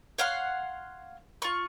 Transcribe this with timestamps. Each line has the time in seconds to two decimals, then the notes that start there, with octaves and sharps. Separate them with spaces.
0.18 C#5 F5 F#5 C6
1.42 F4 C#6